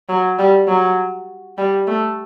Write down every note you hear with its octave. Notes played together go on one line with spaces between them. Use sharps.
F#3
G3
F#3
G3
A3